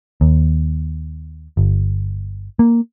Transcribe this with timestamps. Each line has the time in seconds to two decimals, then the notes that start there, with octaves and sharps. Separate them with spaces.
0.21 D#2
1.57 G1
2.59 A#3